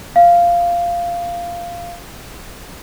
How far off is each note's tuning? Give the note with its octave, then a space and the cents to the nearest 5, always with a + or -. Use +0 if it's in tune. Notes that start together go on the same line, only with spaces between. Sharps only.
F5 -10